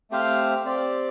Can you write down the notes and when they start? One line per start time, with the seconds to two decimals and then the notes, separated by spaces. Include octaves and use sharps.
0.11 A3 C4 G4 C5 F5
0.65 C4 G4 D5